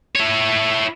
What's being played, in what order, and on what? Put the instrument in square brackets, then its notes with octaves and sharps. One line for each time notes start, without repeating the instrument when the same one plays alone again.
[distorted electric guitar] E4 C#5